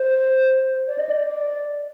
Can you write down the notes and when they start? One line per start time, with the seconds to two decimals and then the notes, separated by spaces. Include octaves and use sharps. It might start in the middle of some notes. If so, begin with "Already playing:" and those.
Already playing: C5
0.88 D5
0.98 D#5
1.09 D5